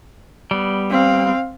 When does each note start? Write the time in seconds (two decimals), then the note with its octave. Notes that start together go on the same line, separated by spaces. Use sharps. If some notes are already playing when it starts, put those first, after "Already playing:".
0.51 G3 B3
0.90 C4 F5